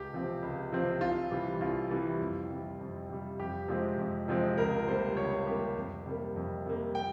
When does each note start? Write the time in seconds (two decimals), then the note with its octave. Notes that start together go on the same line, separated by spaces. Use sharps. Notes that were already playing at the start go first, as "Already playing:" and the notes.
Already playing: C#2 G4
0.13 C3 F3 C4
0.42 C#2
0.72 C3 F3 C4
1.01 C2 F4
1.31 C3 E3 G3
1.61 C2 F4
1.91 C3 E3 G3
2.21 F2
2.50 C3 G3
2.79 F2
3.09 C3 G3
3.39 F2 G4
3.68 C3 F3 G#3 C4
3.98 F2
4.28 C3 F3 G#3 C4
4.58 C#2 A#4
4.87 C3 G3 A#3 C5
5.17 C#2 C#5
5.46 C3 G3 A#3 G4
5.77 F2
6.06 C3 G3 A#3
6.36 F2
6.66 C3 G3 A#3
6.95 G5